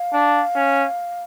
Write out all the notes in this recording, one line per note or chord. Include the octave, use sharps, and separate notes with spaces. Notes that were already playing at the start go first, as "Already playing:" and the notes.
Already playing: F5
D4
C#4